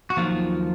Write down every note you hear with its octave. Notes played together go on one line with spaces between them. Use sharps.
F#4
D#2 D#3 F3 F#3 F4